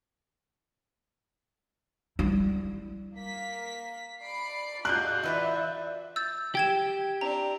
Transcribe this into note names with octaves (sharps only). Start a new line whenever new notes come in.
G3 E4
A#3 B6
D5 B5 C7 D7
G3 F4 F#4 G#4 D#5 F#6 G6
E3 B4 D5 E5
E6 G6 A6
G4 G5 G#6 E7
C4 D4 E4 A#5